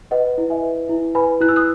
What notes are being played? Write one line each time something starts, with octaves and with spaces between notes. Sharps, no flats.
B4 D#5 F#5
E4
E5 G#5
B4
E4
B4 G#5 B5
E4 F#6
E6
D#6 F#6